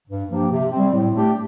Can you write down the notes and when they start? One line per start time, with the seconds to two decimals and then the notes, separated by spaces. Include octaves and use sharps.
0.08 G2
0.29 F3 A#3 D4 G4
0.50 C3
0.71 G3 C4
0.92 A2
1.15 A3 D4 G4